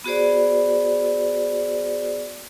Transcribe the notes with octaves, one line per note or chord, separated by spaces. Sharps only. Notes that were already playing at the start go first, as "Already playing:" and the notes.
B3 F#4 G#4 C5 D5